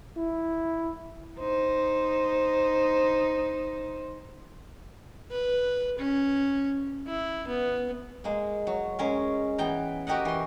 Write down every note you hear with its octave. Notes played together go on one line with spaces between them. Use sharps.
E4
D#4 C5
B4
C#4
E4
B3
G#3 A#3
F#3
G#3 C#4 A#4
E3 B3 G5 A#5
F#4 G4 A#4 D#5 F#5
E3 C6